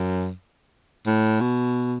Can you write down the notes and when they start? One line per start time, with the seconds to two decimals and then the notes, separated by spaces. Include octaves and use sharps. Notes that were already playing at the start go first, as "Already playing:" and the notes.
Already playing: F#2
1.06 A2
1.41 B2